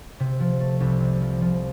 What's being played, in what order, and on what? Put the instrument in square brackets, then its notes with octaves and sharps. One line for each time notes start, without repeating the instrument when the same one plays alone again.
[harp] C3
F3
A3
C2
C3
F3
F3